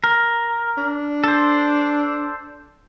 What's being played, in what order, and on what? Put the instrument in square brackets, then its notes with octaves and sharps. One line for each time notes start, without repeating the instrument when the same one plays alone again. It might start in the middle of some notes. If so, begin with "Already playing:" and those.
[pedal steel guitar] A#4
[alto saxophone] D4
[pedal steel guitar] A4 C5